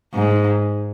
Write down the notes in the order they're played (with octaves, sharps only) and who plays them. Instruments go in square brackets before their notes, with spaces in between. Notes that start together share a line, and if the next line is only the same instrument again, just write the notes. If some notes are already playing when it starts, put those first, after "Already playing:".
[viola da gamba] G#2